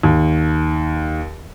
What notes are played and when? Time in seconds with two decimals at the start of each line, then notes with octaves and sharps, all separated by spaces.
0.03 D#2